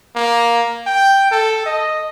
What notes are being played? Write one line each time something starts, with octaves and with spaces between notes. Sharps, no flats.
A#3
G5
A4
D#5